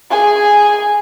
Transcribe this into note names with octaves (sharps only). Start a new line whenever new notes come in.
G#4 G#5